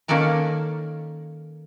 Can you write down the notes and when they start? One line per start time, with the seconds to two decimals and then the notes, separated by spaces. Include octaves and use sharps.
0.08 D#3 A#3 C#4 A4 D5 A#5